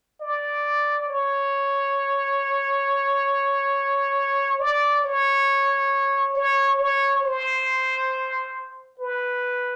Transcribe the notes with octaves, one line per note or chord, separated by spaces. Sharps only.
D5
C#5
D5
C#5
C#5
C#5
C5
B4